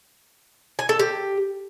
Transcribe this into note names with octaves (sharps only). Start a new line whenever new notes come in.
G#5
A4
G4